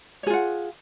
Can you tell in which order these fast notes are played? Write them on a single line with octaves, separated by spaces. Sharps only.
C#5 G#4 F4 F#5